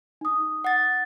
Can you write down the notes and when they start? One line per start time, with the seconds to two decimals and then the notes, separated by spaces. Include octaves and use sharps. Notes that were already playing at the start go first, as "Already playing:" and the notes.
0.21 D#4 D#6
0.64 F#5 A6